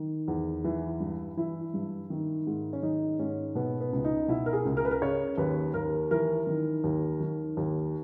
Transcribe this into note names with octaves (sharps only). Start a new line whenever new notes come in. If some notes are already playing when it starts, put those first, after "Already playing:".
Already playing: D#3
E2
E3
G2
E3 E4
G2
D#3
G#2
C#4
D#3 D#4
G#2 C#4
B2 B3
B3
C#2
D#4
B2 E4
A#4
G#4
C#2
A#4
B4
A#4
C#3 C#5
D#2 B4
D#2 A#4
E3 A#4
D#3
D#2
D#3
D#2